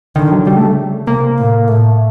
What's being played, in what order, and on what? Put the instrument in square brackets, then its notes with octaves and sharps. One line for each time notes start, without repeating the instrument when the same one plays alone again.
[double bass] D3 [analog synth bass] D#3
[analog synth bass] F#3
[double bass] C#3 [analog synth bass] G3
[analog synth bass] A3
[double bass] C3 [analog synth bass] A#3
[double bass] A2
[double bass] A2 [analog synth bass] A3